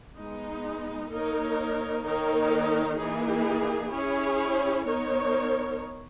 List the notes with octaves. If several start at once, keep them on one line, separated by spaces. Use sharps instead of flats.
G#3 B3 D#4
A#3 D#4 A#4 C#5
D#3 A#3 D#4 A#4 C#5
E3 A#3 D#4 G#4
C#4 E4 G#4 C#5
B3 D#4 A#4 C#5